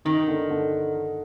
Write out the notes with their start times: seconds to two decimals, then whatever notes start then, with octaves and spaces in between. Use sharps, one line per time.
0.05 D#3 D#4
0.28 D3
0.50 D3